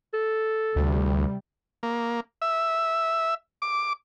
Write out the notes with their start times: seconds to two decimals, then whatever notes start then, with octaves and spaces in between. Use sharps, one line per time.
0.14 A4
0.76 D2 C3 G3
1.83 A#3
2.42 E5
3.62 D6